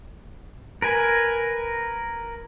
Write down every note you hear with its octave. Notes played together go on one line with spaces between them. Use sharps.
A#4 B4 G#5